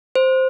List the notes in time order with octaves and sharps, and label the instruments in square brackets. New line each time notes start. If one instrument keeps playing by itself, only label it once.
[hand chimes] C5